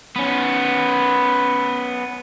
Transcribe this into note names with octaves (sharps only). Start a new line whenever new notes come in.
B3 C#4